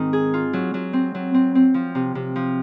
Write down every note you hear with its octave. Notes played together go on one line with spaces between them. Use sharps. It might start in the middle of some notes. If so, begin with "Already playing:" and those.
Already playing: G#2 D#3 C4
G#4
F4
F#3
F#3
C4
F#3
C4
C4
F3
C3
C3
F3